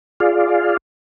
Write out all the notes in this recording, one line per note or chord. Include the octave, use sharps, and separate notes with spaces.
F4 G#4 D5 F5